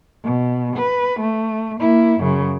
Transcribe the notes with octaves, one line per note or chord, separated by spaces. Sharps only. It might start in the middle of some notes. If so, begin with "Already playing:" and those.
B2
B4
A3
A#3 E4
F#2 C#3